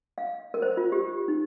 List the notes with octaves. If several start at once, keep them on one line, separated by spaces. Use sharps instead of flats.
F5
A#4
C5
F4
G4
D#4